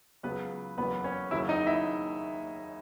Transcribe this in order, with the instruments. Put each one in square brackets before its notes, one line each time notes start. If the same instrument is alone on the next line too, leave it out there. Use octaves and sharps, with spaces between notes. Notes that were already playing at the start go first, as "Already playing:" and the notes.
[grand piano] C#2 C#3 F#3 B3 B4
F#1 E2 C#3 F#3 B3 B4
C#4 C#5
D#2 C#3 F#3 E4 E5
D#4 D#5
E4 E5